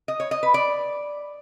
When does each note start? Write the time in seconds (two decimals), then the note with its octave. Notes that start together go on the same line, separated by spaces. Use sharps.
0.08 D#5
0.20 C#5
0.31 D#5
0.43 B4
0.54 D5